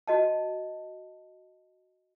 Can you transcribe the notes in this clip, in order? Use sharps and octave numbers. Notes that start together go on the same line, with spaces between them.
F#4 D#5 A5